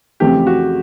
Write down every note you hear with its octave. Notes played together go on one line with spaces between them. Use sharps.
F2 C#3 E3 A3 G4
F#4